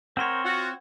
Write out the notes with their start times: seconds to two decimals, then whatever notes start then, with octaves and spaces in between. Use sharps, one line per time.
0.17 C4 A#4 C5 C#5 F#5 C6
0.44 F4 F#4